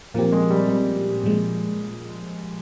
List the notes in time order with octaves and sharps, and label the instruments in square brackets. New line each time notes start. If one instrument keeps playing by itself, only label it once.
[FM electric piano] A#2 F3 C4 G4 [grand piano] A#3
[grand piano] G#3
G3
G3
[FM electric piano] A#2 F3 G#3